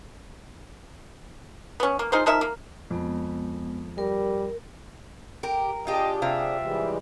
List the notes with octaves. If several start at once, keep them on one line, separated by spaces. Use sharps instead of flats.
B3 C#4
A#3
D#4 F4 G#4 C5
F3 D#4 A#4 E5
A#3
F2 G#3 B3
G3 A#4
G4 A#4
D4 F4 G4 G#4 D#5
C3 C4 F4 E5
E3 G3 G#3